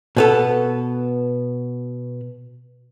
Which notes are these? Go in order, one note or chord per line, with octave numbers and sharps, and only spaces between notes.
B2 B3 A4